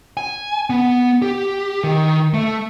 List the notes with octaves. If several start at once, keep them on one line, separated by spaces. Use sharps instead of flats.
G#5
B3
G4
D#3
A3